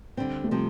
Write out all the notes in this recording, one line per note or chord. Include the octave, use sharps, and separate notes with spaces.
D3 G3 C4
A3
C3 F3 G3 C4